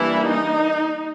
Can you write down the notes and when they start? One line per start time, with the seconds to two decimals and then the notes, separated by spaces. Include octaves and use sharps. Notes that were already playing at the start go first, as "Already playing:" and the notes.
Already playing: E3 G3 A#3 D4 E4
0.28 D#4